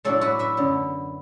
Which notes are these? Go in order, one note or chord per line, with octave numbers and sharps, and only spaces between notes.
A2 F#3 A3 D4 A4
F#4 B4
B4 E5
F#2 D3 B3